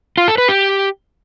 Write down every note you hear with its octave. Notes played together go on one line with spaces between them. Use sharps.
F4
A4
B4
G4